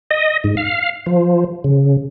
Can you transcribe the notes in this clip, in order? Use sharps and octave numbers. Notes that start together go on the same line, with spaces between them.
D#5
G#2
F5
F3
C#3